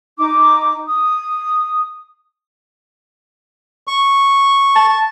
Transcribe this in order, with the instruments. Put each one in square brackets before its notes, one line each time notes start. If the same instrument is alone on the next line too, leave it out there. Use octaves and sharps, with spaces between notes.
[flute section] D#4 D6
D#6
[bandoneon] C#6
[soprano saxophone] A5